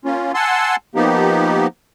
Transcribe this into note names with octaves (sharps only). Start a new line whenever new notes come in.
A#3 C#4 F4
F#5 G#5 A5 C6 E6
F3 A#3 B3 D#4 G4